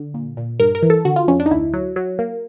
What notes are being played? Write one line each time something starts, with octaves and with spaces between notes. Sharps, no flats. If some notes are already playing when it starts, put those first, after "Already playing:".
Already playing: D3
A#2
A#2
G2 A#4
A#4
E3
A4
D3 F#4
F4
F2 C#4
D4
D#4
D2 E4
F#3
F#3
A#3